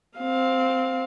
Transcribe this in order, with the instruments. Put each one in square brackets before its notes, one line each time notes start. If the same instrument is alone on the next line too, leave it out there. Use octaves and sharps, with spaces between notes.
[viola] C4 F5